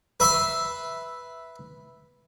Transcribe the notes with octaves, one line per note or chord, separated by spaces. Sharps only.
B4 E5 B5 C6